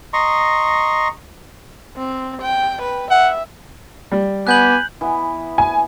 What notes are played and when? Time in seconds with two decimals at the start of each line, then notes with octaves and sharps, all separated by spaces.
0.13 D#5 A#5 C6 C#6
1.97 C4
2.42 G5
2.82 B4
3.11 E5 F#5
4.12 G3
4.47 B3 G4 G#5 B5 F#6 G6 F#7
5.01 E3 B3 B4
5.58 G#5